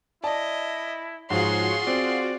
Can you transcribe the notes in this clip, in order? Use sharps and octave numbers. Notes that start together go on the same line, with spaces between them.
E4 D5 D#5 A5
G#2 F3 F4 F#4 G#4 C#5 C6
C4 D5